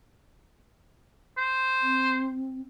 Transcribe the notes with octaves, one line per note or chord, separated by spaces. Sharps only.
C5
C4